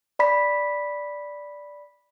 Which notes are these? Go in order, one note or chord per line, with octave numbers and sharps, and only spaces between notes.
D5 B5 B6